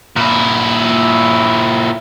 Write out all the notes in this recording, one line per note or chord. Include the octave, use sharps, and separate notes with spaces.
A#2 E4